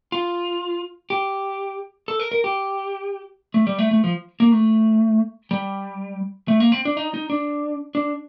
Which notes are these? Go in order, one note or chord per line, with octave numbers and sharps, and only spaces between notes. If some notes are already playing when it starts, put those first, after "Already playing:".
F4
G4
A4
A#4
A#4
G4
A3
G3
A3
A3
F3
A#3
A3
G3
A3
A#3
C4
D4
D#4
D#4
D4
D4